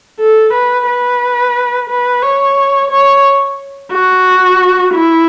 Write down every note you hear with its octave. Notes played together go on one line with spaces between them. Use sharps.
A4
B4
B4
B4
C#5
C#5
F#4
E4